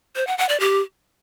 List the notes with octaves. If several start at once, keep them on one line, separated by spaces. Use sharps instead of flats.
C5
F#5
F#5
D5
G4